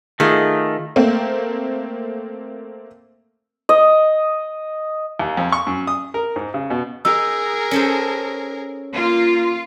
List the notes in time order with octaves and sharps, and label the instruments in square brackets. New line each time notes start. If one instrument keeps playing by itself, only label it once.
[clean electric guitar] D#3 A3 [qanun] F4 G#4
[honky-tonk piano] A3 A#3 C4
[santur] D#5
[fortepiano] D#2
F2
C#6
F#2
D#6
A#4
G#2
C#3
B2
[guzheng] D#4 [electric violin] G#4 A#4 [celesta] E6
[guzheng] C#4 A4 C5
[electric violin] A#3 [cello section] F4